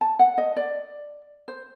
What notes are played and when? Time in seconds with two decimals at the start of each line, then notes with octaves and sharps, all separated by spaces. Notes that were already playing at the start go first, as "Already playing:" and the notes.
0.01 A5
0.19 F#5
0.38 D#5
0.57 D5
1.48 C5